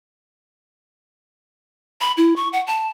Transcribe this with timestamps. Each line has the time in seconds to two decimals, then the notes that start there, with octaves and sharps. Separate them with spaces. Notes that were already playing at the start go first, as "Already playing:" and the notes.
2.01 B5
2.17 E4
2.36 C#6
2.53 F#5
2.67 A5